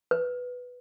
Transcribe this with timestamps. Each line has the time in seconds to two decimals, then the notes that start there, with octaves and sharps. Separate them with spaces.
0.11 B4